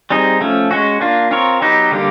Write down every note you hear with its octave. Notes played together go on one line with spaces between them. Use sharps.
G3 C4 D#4 G#4
F3 A3 C#4
G#3 C#4 F#4
A#3 D4 F4
C4 F4 A#4 C#5
F#3 B3 D#4 G4 B4
D3 G3 A#3 D4 G4